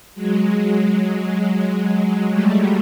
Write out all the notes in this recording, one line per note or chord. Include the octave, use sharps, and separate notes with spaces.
F#3 G#3
G3 A3